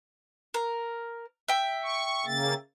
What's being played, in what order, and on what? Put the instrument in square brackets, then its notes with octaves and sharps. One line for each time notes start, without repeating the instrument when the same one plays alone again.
[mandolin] A#4
E5 G5
[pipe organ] C#6
C#3 A#3 A6